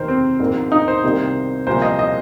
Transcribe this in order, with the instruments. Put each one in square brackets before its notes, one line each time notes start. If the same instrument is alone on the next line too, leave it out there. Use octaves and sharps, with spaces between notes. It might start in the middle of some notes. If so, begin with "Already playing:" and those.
Already playing: [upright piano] F1 D#2 D#3 A#3 D#4 [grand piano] A#4 C5
[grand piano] C4
[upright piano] A#1 G#2 D#3 A#3
[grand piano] D#4
C5
[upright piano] C2 C3 D#3 A#3 D#4
[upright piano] C2 A#2 F3 [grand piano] C5
[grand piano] D#5
D#5